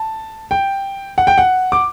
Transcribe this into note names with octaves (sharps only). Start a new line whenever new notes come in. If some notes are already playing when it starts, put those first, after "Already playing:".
Already playing: A5
G5
F#5
G5
F#5
D6